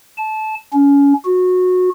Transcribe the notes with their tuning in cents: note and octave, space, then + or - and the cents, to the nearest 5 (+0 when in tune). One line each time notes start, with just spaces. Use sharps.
A5 -20
C#4 +25
F#4 -20